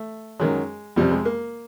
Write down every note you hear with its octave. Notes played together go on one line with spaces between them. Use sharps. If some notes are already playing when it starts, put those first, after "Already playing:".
Already playing: A3
F#2 D#3 F#3 G#3
F2 C3 F3 G3
G#3
A#3